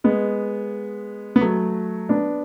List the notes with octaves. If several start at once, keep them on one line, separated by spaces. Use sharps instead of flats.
G#3 B3
B3
F#3 A3
B3 D4